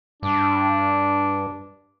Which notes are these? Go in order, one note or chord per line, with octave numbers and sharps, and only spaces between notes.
G2 D4